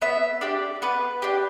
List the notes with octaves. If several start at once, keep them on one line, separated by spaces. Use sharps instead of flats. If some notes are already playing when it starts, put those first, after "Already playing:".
B3 E5
D4 G4 D5
B3 B4
D4 G4